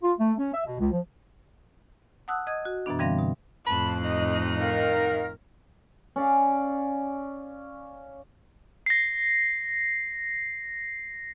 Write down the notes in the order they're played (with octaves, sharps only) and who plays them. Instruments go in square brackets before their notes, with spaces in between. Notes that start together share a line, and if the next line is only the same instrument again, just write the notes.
[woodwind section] F4
A3
C#4
E5
B2
C#2
F3
[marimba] F#5 A5 D#6 E6 F#6
D#5 D#6 G#6
F#4
F#2 B2 E3 B3 D4
D3 E3 G3 C4 F5 A#6
B2
[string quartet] F2 A2 F#6 [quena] A5 [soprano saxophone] B5
[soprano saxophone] D#4 [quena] D#5
[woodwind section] D#3 A#4 [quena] F5
[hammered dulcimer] C#4 D5 F5
[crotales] A#6 C7